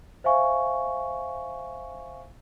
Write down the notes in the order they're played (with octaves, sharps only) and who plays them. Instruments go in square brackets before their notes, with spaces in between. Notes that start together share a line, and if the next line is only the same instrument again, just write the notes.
[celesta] C5 E5 F5 G#5 C#6